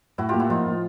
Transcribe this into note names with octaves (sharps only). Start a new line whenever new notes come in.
A2 E4 F#4
A#3 F4 G4
E4 F#4
F3 D#4 F4
A2